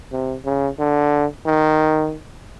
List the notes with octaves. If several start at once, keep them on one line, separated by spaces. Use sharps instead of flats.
C3
C#3
D3
D#3